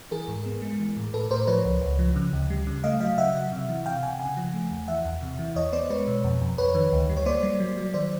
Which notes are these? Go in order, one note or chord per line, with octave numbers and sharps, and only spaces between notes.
E3 G#4 A#4
G#2
B3
G#3
E3
A2
A2 A4 B4
A2 A#4 C5
F3 B4 C#5
C#2
C#2
F3
C#3
D2
G3
C#3
A3 D#5 F5
F#3 D#5 F5
C#3 E5 F#5
F#3
C3
E3
C3 F5 G5
C3 F#5 G#5
C#3 F#5 G#5
F3
A3
E2
E3 E5 F#5
E2
C3
E3
E2 C#5 D#5
B3 C5 D5
G#3 B4 C#5
B2
F2
F2
F2 B4 C#5
D#3
D2
G3
C#5
A#3 C5 D5
G3
F#3
F#3
D#3 C5 D5